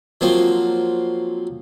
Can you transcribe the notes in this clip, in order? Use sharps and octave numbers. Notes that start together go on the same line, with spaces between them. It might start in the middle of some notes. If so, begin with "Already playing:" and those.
F3 F#3 A#3 C4